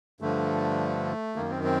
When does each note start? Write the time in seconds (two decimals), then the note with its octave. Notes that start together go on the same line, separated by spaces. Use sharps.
0.21 G2 D3 F3 A3
1.36 F#2 D#3 A#3
1.50 C4
1.64 C4